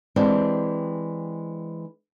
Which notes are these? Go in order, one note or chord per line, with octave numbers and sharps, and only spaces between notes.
E3 G#3 C4 D4 G4